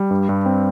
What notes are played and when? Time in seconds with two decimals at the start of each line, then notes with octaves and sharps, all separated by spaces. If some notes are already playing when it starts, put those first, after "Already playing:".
Already playing: G3
0.11 G2
0.29 G2
0.46 C4